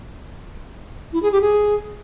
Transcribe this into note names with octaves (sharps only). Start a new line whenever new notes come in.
E4
G#4
G4
G#4